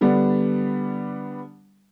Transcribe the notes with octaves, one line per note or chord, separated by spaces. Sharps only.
D3 G3 B3 D4